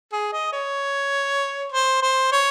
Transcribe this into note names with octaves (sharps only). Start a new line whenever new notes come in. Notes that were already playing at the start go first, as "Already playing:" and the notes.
G#4
D#5
C#5
C5
C5
C#5